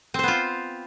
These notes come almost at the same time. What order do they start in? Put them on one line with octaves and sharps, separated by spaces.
C4 C5 B3 F4